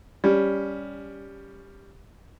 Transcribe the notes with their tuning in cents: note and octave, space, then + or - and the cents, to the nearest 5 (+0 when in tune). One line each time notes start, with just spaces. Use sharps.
G3 +10 C#4 +15